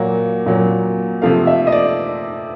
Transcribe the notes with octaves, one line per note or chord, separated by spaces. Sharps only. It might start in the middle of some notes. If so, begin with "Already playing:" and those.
Already playing: A#2 F#3 A#3 F#5
A#2 F#3 A#3
C3 F3 A3 F5
E5
D#5
D5